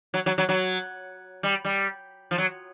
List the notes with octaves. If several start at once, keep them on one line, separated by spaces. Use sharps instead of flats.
F#3
F#3
F#3
F#3
G3
G3
F3
F#3